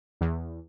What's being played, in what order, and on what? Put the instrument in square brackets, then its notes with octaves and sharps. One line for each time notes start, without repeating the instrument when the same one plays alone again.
[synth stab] E2